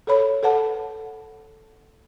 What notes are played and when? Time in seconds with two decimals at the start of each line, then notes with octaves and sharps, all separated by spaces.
0.07 A4 B4 C#5 B5
0.43 A4 B4 F#5 A5